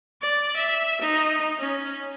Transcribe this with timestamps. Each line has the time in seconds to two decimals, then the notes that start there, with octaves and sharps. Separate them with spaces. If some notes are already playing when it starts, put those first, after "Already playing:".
0.22 D5
0.56 E5
1.01 D#4
1.59 C#4